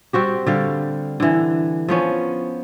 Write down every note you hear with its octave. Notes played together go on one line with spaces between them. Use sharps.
G3 C4 F#4 G4
D3 G3 F5
D3 E3
F3 B3 C#4